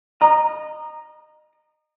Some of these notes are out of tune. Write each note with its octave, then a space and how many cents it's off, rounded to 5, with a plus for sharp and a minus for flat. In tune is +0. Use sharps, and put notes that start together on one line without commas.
D#5 -25 A#5 +0